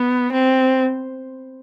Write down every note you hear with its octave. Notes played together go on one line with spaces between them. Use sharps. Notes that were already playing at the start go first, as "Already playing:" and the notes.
Already playing: B3
C4